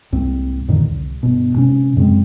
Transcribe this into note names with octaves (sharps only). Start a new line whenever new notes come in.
C2 G#2 C4
F2 A2 D3 D#3
C2
G1 B2
G#2 C3 C#4
F#2 C#3 G#3 C4